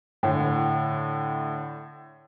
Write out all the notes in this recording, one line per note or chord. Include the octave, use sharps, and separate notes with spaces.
A2 D3